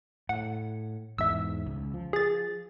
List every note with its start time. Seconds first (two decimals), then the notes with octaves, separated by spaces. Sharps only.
0.29 A2 F#5
1.18 E2 G#2 E5 E6
1.66 C#2
1.94 F3
2.13 G#4 A6